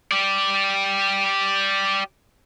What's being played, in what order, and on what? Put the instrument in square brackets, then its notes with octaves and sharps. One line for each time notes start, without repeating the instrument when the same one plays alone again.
[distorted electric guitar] G4 D5